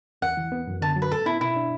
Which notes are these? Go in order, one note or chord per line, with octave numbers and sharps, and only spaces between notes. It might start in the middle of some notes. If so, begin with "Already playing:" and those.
E2 F#5
E3
B3
F#2
D3 A5
F#3
B4
A2 A4
B3 E4
B2 E4
D4